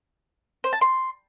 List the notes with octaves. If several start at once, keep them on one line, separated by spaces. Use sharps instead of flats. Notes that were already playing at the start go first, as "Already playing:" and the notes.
C5
A5
C6